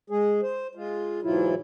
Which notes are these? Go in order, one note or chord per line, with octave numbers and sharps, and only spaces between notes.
G#3 G#4
C5
G#3 F4
G#2 B2 E3 F#3 E4 F4